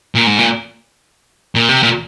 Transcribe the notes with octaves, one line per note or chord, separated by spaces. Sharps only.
A#2
G#2
A#2
A#2
C3
A#2